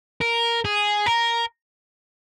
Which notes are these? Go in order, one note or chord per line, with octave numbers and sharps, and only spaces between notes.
A#4
G#4
A#4